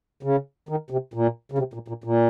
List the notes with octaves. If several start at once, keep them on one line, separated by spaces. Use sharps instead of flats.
C#3
D#3
C3
A#2
C#3
C3
A#2
A#2
A#2